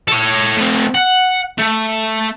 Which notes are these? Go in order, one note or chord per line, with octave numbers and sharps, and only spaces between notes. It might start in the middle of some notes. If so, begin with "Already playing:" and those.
A4 C#5
A3 C4
F#5
A3